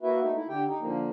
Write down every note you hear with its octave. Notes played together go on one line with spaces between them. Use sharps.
A#3 E4 F#4 B4 E5
A3 D#4
E4
D3 G4 G5
D#4
D3 F3 A#3